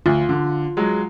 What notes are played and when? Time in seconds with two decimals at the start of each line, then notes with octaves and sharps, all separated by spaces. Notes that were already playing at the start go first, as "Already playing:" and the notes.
0.06 D2 F4
0.29 D3
0.77 F#3 G#3